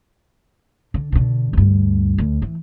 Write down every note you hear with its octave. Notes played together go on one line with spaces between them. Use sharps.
D3
B2 D3
D2 G2
D2
E3